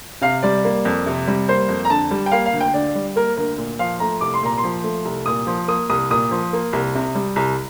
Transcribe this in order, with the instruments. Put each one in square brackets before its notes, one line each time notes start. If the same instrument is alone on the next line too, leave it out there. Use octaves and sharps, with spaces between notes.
[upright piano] C3 F5
G3 D5
A#3
F2
C3
G3
A#3 C5
F2
A#5
D3 A5
G3
G5
A#3 F5
F5
D2
G5
D3 D5
G3
A#3 A#4
D2 A#4
A#2
F3 F5
A3 A#5
C2 D6
C6
A#2 A#5
C6
F3
A3
C2
A#2 D#6
F3
A#3 D#6
C2 D#6
A#2 D#6
F3
A#3
C2
C3
G3
C2